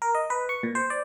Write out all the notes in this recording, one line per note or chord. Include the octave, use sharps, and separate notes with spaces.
A#4
D#5
B4
C#6
A#2
C5
D5